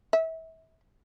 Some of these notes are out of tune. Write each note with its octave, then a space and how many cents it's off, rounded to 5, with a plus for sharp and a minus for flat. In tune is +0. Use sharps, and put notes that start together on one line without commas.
E5 -30